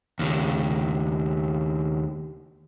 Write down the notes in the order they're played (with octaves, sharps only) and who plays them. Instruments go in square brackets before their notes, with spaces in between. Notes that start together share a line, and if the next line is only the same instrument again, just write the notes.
[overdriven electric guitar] D#2 C#3